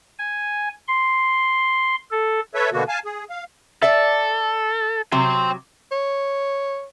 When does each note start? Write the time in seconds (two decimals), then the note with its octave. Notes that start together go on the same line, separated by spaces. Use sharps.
0.19 G#5
0.88 C6
2.11 A4
2.55 A4 B4 C#5 E5
2.73 B2 D3 A#3 B3 F#4
2.88 F5 G#5 A5
3.05 G#4
3.30 F5
3.82 A4 D5 E5
5.12 C3 F#3 G5 C6
5.91 C#5